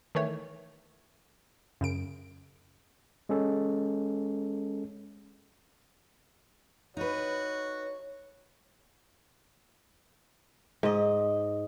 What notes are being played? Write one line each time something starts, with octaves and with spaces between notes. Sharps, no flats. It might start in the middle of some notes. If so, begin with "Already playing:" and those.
D#3 E3 A3 C#5
F#2 C#3 D7
G#3 C#4 A4
D#4 F#4 B4 C#5
G#2 D#5